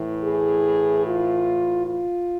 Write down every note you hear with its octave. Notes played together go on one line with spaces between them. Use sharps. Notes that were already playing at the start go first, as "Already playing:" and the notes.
Already playing: A2 E3
G#4
F4
F4